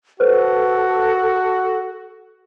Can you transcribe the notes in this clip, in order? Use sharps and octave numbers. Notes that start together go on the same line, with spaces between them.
F#4 A4 B4 C5